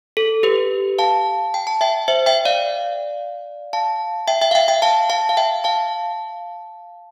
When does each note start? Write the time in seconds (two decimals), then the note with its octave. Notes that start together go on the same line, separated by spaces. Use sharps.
0.17 A4
0.43 G4 B4
0.98 F5 A5
1.54 G5
1.67 A5
1.81 E5 G5
2.08 C5 E5
2.26 E5 G5
2.45 D5 F5
3.73 F5 A5
4.28 E5 G5
4.41 E5 G5
4.51 F5
4.55 E5 G5
4.68 E5 G5
4.82 F5 A5
5.10 F5 A5
5.29 F5
5.37 E5 G5
5.64 F5 A5